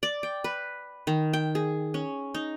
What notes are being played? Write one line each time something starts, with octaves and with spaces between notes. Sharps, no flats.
D5
G5
B4
D#3
G5
G#4
C#4
D#4